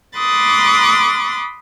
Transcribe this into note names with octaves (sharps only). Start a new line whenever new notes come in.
B5 C6 D6 D#6 F#6 A6